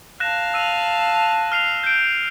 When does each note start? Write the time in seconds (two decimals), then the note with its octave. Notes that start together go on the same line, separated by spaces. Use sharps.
0.20 F5 A5 F#6 A#6 E7
0.54 E6 D#7 F7
1.52 F6 C7 F7
1.84 G6 D7